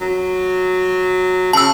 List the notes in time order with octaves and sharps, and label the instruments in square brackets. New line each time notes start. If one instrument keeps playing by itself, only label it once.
[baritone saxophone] F#3
[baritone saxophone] C#3 [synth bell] A5 E6